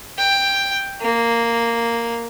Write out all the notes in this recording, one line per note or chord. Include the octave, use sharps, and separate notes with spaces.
G5
A#3